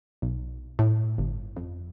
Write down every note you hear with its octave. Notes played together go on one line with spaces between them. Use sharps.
B1
A2
G1
F2